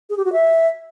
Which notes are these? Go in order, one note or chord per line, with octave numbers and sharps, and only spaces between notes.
G#4
G4
F#4
E5